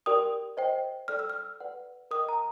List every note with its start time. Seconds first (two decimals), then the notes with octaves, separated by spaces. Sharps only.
0.06 G4 A#4 D5 G5 D#6
0.57 C5 D#5 G5
1.08 A4 D5 G5 F6
1.19 E6
1.30 F6
1.60 B4 D5 F#5
2.11 A#4 D#5 G5 D#6
2.29 A#5